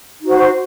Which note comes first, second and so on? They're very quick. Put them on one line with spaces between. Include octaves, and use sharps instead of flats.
D#4 F#4 C5